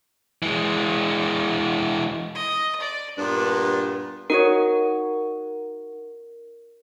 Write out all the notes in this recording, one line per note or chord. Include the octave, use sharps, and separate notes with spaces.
E3 G#3
D#5
D5
G2 A#2 B3 D4
D#4 F#4 A#4 C#5